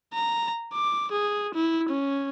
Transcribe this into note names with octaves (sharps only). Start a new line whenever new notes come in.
A#5
D6
G#4
E4
C#4